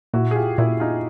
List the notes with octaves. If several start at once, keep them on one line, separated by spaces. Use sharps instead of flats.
A#2 E4 F#4
G#4
F4 G4
A#2 E4 F#4
D#4 F4